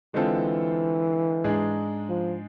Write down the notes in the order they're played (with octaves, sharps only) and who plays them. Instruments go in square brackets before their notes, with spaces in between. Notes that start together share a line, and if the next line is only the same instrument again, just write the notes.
[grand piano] D3 G#3 C4 F4 A4 [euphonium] E3
[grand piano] G#2 G#3 D4 G#4
[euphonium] F3